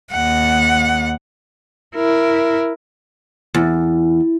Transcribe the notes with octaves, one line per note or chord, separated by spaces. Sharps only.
D#2 F#5
E4 A#4
E2